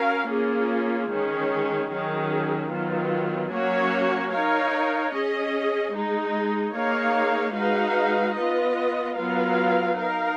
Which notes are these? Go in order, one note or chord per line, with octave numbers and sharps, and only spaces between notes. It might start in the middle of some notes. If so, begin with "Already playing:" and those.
Already playing: C#4 F#4 A#4 F5
A#3 C#4 F4 G#4
D#3 G#3 C#4 G#4
D#3 F#3 C#4 G#4
D#3 F#3 B3 F4
F#3 A#3 C#4 F#4 C#5
D#4 A#4 C#5 F5
C#4 G#4 D#5
G#3 D#4 G#4
A#3 D#4 G#4 C#5 F5
G#3 D#4 F#4 B4 F5
B3 F4 B4 D#5
F#3 B3 F4 A#4 F5
D#4 A#4 F5